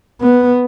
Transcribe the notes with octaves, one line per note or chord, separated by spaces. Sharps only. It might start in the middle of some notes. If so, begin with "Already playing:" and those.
B3